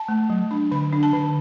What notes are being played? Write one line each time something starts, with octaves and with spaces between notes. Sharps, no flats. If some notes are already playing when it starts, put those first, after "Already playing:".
Already playing: A5
A3
F#3
D4
D3 B5
D4
A5
D3